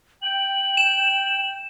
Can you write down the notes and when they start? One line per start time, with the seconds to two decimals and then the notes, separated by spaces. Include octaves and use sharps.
0.23 G5 F#7
0.77 E7